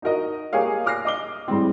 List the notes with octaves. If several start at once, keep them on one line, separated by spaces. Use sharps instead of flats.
D#4 F#4 A#4 D#5
A#3 G4 G#4 A#4 C#5 F5
D6 F6 A#6 C7
D#5 D6 G7
A2 G3 G#3 C4